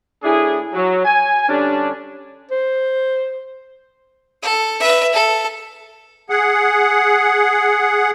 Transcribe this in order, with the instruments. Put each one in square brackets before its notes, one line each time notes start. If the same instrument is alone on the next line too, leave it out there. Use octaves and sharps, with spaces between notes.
[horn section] A2 D4 E4 G#4
F#3
G#5
D3 G3 C#4 D4
[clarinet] C5
[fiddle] A4
B4 E5
A4
[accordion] G#4 F#5